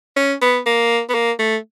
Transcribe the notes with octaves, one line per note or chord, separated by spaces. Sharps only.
C#4
B3
A#3
B3
A#3
A3